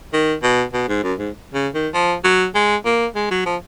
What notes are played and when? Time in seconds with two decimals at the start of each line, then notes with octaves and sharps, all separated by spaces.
0.13 D#3
0.43 B2
0.73 B2
0.88 G#2
1.03 F#2
1.19 G#2
1.54 C#3
1.74 D#3
1.94 F3
2.24 F#3
2.55 G#3
2.85 A#3
3.16 G#3
3.31 F#3
3.46 F3